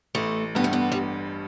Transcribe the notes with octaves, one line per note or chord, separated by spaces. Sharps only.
A1 A3
G2 G3 B3
A3
B3
G3